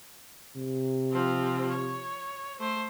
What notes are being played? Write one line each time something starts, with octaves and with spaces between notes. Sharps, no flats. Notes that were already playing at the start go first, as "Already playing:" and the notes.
C3
F3 C4
C#5
A3 C5